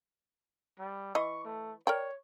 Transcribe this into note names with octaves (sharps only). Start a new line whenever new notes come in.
G3
E3 D#5 C#6
A3
A#4 C#5 D5 G5